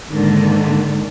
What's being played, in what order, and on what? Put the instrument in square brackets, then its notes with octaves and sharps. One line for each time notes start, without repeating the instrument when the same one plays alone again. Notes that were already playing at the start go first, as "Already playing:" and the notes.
[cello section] G#2 D3 D#3 A#3